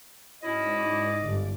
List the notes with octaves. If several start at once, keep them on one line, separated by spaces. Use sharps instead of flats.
G#2 F#3 C#4 E4 D5 D#5 D6
G1 G2